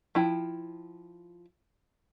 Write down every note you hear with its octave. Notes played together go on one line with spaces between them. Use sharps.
F3 E4 G5